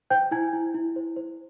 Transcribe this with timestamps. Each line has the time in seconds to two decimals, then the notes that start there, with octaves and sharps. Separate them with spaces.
0.10 C5 G5 G6
0.31 E4 G#5 G#6
0.53 E4
0.74 E4
0.96 C5
1.16 C5